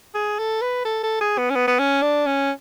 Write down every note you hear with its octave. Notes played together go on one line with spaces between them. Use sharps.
G#4
A4
B4
A4
A4
G#4
B3
C#4
B3
B3
C#4
D4
C#4